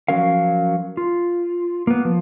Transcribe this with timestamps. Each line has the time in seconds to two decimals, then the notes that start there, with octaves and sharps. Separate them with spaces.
0.08 F3 F#3 C#4 A#4 F5
0.97 F4
1.87 A#3 B3
2.05 F3